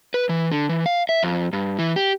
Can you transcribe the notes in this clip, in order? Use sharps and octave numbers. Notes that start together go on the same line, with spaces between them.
B4
E3
D3
E3
F5
E5
F2
G2
E3
G4